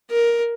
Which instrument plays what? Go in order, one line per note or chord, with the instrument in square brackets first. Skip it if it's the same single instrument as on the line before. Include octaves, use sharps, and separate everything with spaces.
[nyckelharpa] A#4